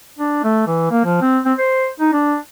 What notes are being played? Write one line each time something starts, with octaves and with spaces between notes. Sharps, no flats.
D4
A3
E3
A#3
F3
C4
C4
C5
D#4
D4